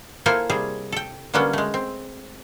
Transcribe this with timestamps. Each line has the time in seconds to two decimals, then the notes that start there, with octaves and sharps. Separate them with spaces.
0.26 A#3 E4 F4 A4 C5 G#5
0.49 C3 G3 G#4
0.92 A4 G5
1.34 D3 F#3 G3 A#3 B3 C#4
1.53 G#3 A3
1.74 C4